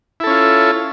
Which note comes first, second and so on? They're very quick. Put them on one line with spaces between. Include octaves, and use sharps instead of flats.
E4 A4 C#4 F4